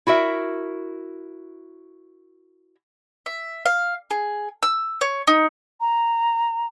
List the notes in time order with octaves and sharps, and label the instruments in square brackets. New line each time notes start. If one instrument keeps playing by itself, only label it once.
[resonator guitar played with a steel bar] E4 F#4 A#4 E5
[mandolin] E5
F5
G#4
E6
C#5
D#4
[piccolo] A#5